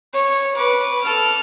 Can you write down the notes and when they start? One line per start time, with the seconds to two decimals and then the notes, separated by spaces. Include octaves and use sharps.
0.14 C#5
0.55 B4 D6
1.02 A4 F6